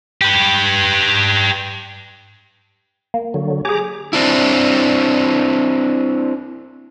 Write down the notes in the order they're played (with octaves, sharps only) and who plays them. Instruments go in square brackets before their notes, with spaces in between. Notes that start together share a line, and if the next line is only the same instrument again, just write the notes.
[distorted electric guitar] G4 B4
[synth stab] A#3
[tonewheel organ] D3 F#3
[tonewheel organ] G4 A#5 D6 [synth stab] G#4 G#5
[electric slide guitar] C4 D4 E4